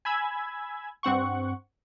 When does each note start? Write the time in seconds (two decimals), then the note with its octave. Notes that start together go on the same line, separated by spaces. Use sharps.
0.05 G#5 B5 E6 G#6
1.03 G2 C4 F#5 C#6